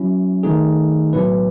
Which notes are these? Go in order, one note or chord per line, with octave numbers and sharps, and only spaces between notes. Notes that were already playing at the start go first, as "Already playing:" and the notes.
Already playing: F#3 C#4 E4
D#3 A3 D#4 G#4
A2 F#3 B3 E4 B4